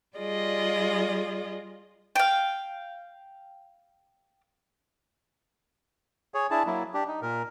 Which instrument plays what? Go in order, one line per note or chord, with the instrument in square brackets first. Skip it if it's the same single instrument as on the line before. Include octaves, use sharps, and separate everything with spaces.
[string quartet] G3 F4 G#4 D5 D#5
[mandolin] F5 G5
[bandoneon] G#4 C#5
D4 E4 G#4 A5
F#3 A#3 E4
D4 G4
D#4
A#2 A#4